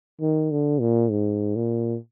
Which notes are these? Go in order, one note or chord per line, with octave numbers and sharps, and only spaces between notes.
D#3
D3
A#2
G#2
A#2